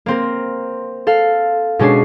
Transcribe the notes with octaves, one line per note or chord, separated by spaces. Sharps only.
A#3 C4 A#4
A4 F5
B2 G#3 C#4 D4 C7